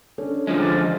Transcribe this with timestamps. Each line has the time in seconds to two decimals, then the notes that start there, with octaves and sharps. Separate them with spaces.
0.18 C#4 D4 A4
0.47 D3 F3 G#3
0.60 D6 A6
0.75 E3 D4 E4